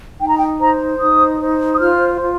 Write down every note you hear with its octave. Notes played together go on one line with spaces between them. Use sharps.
D#4 G5
A#5
G5
C5 A#5
D#4 D#6
C5
D#6
F4 F6
F4